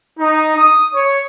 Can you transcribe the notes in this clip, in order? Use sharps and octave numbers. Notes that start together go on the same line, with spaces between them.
D#4
D#6
C#5